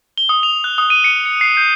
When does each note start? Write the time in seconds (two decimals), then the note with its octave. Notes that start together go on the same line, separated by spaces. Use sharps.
0.18 G7
0.29 D#6
0.43 F7
0.64 F#6
0.78 D#6
0.90 D#7
1.04 C#7
1.25 C#7
1.41 C7
1.57 G6